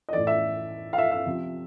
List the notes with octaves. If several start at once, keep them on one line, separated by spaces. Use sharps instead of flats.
D#5
A2 E3 D5
E5
F5
E5
E5
C3 F3